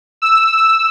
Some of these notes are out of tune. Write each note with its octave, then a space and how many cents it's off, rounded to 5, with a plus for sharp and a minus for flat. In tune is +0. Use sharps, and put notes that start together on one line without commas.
E6 +0